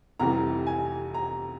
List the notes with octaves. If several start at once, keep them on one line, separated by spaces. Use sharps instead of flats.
F1 F2 E3 G3 A#5
G#5
A#5